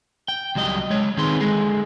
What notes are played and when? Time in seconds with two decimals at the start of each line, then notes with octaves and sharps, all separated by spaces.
0.28 G5
0.55 C#2 F#3 G3 D#5
0.90 G#3 C#5
1.17 D#3 C4 D#4 G#4 B4 C6
1.41 D3 G#3 G#4